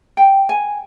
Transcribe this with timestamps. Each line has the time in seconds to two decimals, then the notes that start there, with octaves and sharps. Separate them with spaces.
0.17 G5
0.49 G#5